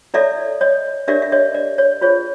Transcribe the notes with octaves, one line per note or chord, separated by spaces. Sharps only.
E4 A4 C#5 D5 E5
C#5 D#5
D4 G4 A#4 C#5 D5 E5
E5
C#5 D#5
D5
C#5
F4 G#4 C5 C#5